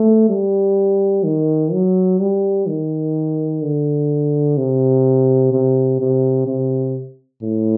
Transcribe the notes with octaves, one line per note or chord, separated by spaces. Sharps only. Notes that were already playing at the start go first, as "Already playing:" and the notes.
Already playing: A3
G3
D#3
F#3
G3
D#3
D3
C3
C3
C3
C3
A2